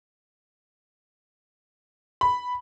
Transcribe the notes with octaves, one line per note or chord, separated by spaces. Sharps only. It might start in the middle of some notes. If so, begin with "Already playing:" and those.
B5